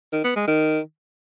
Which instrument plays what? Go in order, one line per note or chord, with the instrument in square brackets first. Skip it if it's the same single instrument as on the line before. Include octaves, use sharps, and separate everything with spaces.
[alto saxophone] D#3
B3
G#3
D#3